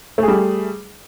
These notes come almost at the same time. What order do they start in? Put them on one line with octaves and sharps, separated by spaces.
A3 G#4 G3